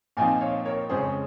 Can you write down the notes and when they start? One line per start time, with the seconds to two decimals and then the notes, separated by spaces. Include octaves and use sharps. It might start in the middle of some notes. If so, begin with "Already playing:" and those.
0.17 A#2 F3 C4 D#4 F5 G#5
0.41 C#5 F5
0.65 A#4 C#5
0.89 F2 C#3 G#3 C#4 G#4 C5